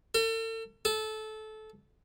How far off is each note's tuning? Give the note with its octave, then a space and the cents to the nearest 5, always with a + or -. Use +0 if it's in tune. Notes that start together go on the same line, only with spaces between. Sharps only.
A4 +40
A4 -20